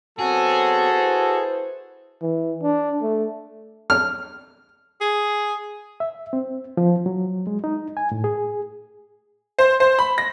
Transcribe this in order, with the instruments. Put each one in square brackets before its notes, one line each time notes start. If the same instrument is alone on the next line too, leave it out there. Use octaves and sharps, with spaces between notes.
[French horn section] F#3 B3 C4 [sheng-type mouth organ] F#4 [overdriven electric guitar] G#4 [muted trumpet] A4
[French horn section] E4 B4 C5
[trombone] E3
D4
A3
[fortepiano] F6
[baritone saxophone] G#4
[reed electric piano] E5
C4
F3
F#3
G#3
D#4
G#5
A2
G#4
[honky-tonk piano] C5
C5
B5
A#6